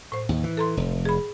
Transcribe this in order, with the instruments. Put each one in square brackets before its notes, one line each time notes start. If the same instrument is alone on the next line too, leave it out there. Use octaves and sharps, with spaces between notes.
[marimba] A2 C5
[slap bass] D#2
E3
[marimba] A4 A#5 C6
[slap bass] F1
[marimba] G#4 B5